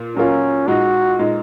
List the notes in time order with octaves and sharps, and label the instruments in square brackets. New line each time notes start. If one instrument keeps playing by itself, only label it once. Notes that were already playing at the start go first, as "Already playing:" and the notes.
Already playing: [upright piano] A#2 A#3
[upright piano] A#2 F#3 A#3 F4 A#4 [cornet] C#4
[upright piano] A#2 G#3 D#4 [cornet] F#4
[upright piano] A#2 G#3 D#4